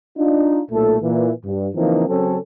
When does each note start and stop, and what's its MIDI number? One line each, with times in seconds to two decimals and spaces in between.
0.17 0.60 62
0.17 0.60 63
0.17 0.60 65
0.70 0.96 35
0.70 0.96 46
0.70 0.96 57
0.70 0.96 69
1.01 1.30 46
1.01 1.30 52
1.01 1.30 58
1.44 1.67 43
1.75 2.07 49
1.75 2.07 52
1.75 2.07 53
1.75 2.07 58
1.75 2.07 60
1.75 2.07 63
2.08 2.36 49
2.08 2.36 54
2.08 2.36 60
2.08 2.36 61
2.08 2.36 69